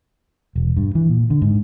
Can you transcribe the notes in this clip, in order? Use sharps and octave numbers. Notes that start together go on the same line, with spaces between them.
E1
G2
E3
A#2
D3
G#2